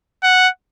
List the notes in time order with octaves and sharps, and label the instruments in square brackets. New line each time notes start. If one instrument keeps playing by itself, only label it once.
[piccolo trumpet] F#5